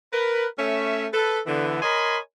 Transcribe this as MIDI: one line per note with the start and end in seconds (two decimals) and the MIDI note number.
0.13 0.47 70
0.13 0.47 71
0.59 1.07 57
0.59 1.07 61
0.59 1.07 76
1.13 1.40 69
1.13 1.40 71
1.47 1.79 50
1.47 1.79 52
1.47 1.79 59
1.82 2.18 70
1.82 2.18 73
1.82 2.18 75
1.82 2.18 80
1.82 2.18 83
1.82 2.18 84